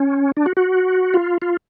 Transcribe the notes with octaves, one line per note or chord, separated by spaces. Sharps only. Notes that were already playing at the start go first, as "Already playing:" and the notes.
Already playing: C#4
D4
F#4
F#4
F4
F4